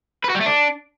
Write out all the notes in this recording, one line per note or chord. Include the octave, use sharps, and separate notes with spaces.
B4
F#4
G3
A3
D4